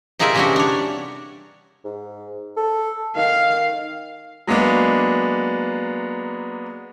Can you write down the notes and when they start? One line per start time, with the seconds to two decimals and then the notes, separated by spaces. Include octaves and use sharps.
0.19 C3 D#4 F4 G#4 A#4 E5
0.35 C3 E3 G3 C#4 D4 F#4
0.56 D4 C#5
1.84 G#2
2.56 A4
3.16 D#3 F5
4.47 F#3 G#3 A#3 B3 D4